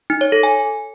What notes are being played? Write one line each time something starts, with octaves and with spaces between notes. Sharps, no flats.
D#4
C#5
A4
G#5